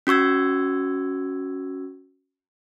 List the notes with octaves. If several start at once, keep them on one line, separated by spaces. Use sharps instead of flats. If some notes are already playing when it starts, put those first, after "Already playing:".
C#4 F#4 C#6 E6 G#6